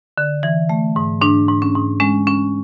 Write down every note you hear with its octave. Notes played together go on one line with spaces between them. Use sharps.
D3
E3
A3
G#2
G#2 D4
G#2
C#4
G#2
G#3 C#4
C#4